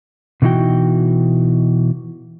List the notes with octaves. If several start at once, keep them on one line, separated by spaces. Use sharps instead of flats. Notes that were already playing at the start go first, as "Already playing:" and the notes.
B2 D3 E3 D#4 F#4 G5